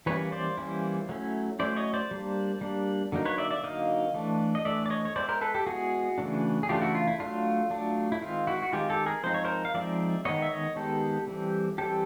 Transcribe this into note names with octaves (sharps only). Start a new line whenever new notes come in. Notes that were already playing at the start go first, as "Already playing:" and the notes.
E3 G3 A#3 C#4 E4 B4 C#5
C5 D5
E3 G3 A#3 C#4 E4
F#3 A3 C#4 E4
F#3 A3 C#4 E4 C5 D5
C#5 D#5
C5 D5
G3 A#3 D4
G3 A#3 D4
D3 F#3 A#3 D#4
B4 C#5
D5 E5
D5 E5
D3 F#3 A#3 D#4 D#5 F5
E3 A3 D4
D#5
E3 A3 D4 D5 E5
D5
C#5 D#5
C#5
G#3 B3 E4 C5 D5
A#4 C5
A4 B4
G4 A4
G#3 B3 E4 F#4 G#4
C#3 E3 A3 D4
G#4
C#3 E3 A3 D4 F4 G4
E4 F#4
F4
E4
F#3 A3 D4 F4
F#3 A3 D4
E4
D#3 G#3 C4 F4
E4 F#4
F#4
D#3 G#3 C4 F4 G4
G4 A4
G#4 A#4
F3 G#3 C4 D#4 C5
C#5
A#4 C5
F5
F3 G#3 C4 D#4 D5 E5
D#3 G#3 B3 C#5 D#5
E5
C#5 D#5
D#3 G#3 B3 G4 A4
E3 G3 C4
E3 G3 C4 G4 A4